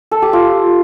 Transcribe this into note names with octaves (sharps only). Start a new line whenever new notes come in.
A4
G4
F4